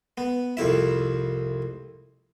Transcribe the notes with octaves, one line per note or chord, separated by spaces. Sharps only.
B3
C2 F2 E4 E5